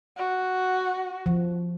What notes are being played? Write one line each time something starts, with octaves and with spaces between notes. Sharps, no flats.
F#4
F3